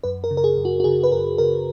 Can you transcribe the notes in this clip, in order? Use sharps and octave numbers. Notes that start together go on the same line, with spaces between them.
F#2 B4
A#4
C#3
A#4
G#4
F#2
F#4
F#4
C#3 G#4
B4
F#2 A#4
C#3 A#4